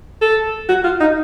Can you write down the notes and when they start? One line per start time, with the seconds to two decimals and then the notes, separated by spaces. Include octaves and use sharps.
0.22 A4
0.69 F#4
0.84 F4
1.01 D#4